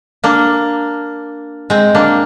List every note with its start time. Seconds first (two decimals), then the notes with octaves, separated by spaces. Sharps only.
0.24 A#3 D4
1.70 G#3 C4
1.95 A#3 D4